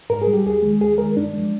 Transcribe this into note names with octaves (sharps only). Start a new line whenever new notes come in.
G#2 A#4
G#4
G3
G4
D#2 G#4
D#3 G#3
D#2 G#4
D#3 G#3 A#4
G2 D4
F3 G#3